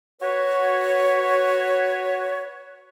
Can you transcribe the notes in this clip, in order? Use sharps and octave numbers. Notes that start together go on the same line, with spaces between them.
F#4 B4 C#5